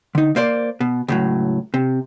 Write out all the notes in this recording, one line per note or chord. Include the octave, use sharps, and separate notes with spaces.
D3 D#4
A#3 C5 D5
B2
C#2 A2 F#3
C3